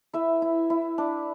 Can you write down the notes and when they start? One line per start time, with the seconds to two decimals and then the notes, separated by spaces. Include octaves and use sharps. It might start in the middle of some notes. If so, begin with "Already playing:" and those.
0.13 E4 B4 E5
0.42 E4
0.70 E4
0.98 D4